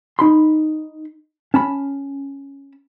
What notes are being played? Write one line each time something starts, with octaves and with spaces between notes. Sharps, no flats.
D#4 B5 C6
C#4 A5 B5